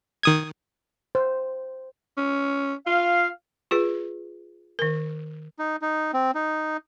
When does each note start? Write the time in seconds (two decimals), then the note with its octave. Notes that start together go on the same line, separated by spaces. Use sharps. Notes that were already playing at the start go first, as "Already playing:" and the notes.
0.23 D#3 D#6 G#6
1.15 C5
2.17 C#4
2.86 F4 F5
3.71 F4 G#4 B4
4.79 D#3 A#4
5.59 D#4
5.82 D#4
6.14 C4
6.35 D#4